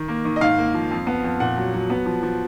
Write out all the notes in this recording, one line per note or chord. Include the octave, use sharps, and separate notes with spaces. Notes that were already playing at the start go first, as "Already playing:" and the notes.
Already playing: D#3
A#3
D#3
D#5
G#2 F5
A#3
F3
F2
B3
F2
A#2 F#5
F#3
F#3
B3
F3
F3